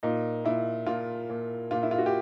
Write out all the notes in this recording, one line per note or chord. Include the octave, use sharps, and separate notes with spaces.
A#2 D#4
A#2 E4
A#2 F4
A#2
A#2 F4
E4
F4
F#4
G4